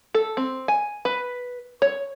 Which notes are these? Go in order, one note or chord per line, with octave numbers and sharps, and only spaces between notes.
A4
C4
G#5
B4
C#5